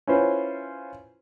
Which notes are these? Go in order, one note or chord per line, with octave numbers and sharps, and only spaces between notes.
C#4 E4 F4 B4 C5